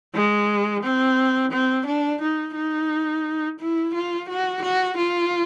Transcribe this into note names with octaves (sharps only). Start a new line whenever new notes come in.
G#3
C4
C4
D4
D#4
D#4
E4
F4
F#4
F#4
F4